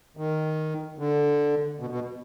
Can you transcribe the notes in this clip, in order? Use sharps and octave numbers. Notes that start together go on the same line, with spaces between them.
D#3
D3
B2
B2